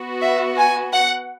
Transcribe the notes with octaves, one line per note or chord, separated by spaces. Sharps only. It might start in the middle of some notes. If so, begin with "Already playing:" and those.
Already playing: B3 F#4
E5
G#5
F#5